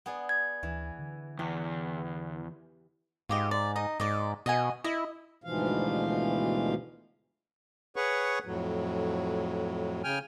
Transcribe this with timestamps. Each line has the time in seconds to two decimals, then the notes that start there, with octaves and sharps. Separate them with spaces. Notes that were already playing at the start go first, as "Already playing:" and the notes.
0.06 B3 G#4 D5
0.29 G#6
0.63 D2 E3
0.99 D3
1.39 E2 G4
3.29 G#2 F4 G4 D#5
3.51 D5
3.76 D#4 D#5
4.00 G#2 D5 D#5
4.46 B2 D#5 F#5 G#5
4.84 E4 D#5
5.44 D2 G#2 B2 E3 F3 F5
7.96 G#4 B4 C#5 F#5 C#6
8.46 F2 A2 F#3
10.04 C#3 G5 G#5 F6